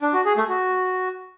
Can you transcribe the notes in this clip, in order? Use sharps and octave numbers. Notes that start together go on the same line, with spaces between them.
D4
F#4
G#4
A3
F#4